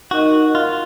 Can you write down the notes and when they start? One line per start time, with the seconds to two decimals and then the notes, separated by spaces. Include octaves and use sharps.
0.11 D#4 F#4 A#4 D#5
0.55 F4